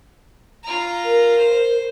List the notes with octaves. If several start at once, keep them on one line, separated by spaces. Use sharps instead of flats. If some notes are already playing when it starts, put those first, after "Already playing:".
F4 A#5
A#4
C5